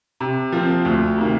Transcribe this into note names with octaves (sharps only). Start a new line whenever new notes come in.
C3
F3 C4
D2
C3 D#3 A#3